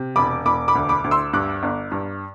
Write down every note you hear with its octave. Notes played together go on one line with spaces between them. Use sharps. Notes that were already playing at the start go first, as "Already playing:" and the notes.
Already playing: C3
E1 B5 D6
E1 B5 D6
B5 D6
D2
B5 D6
D2
C6 E6
G2 D6 F#6
G1
G2